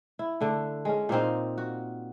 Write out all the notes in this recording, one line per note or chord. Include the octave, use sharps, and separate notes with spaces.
E4
D3 A3
G#3 C#4
A#2 A#3 C4 D#4
F#4